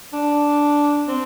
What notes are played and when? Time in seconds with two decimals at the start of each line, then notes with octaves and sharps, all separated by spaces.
0.13 D4
1.08 C4